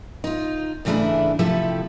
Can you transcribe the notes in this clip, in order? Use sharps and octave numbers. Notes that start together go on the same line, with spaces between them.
D#4 F4
G#2 C#3 E3 A3 D4 E4
C3 F3 A3 E4 G4 A4